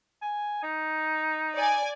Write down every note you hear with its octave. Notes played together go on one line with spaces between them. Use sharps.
G#5
D#4
D5 G#5